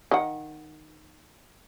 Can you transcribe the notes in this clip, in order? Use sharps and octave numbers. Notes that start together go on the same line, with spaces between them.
D#3 F#5